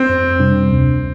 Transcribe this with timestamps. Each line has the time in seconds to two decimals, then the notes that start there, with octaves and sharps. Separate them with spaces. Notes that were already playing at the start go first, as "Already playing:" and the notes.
Already playing: C4
0.09 F2
0.40 C3 G3 D4
0.70 D2